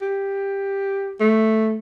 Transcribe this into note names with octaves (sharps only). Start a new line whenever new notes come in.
G4
A3